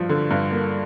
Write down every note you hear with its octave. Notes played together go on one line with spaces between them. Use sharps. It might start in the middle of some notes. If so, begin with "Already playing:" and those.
Already playing: G2 F3
D3
G2
A#3